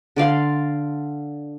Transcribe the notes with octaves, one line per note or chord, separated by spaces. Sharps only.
D3 D5 F5 C6